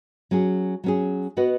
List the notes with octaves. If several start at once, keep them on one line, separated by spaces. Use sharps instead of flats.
F#3 C#4 G#4
F#3 C#4 G#4
B3 F#4 B4 D#5